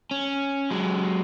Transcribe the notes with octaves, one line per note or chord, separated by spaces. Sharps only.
C#4
F#3 G#3